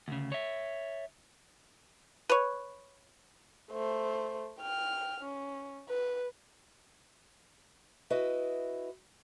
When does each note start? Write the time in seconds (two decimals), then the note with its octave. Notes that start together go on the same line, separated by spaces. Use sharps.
0.08 D2 C#3
0.32 C#5 E5
2.29 B4 C#5
3.71 A3 C5
4.60 G5 F6
5.21 C#4
5.89 B4
8.10 E4 F#4 B4 D#5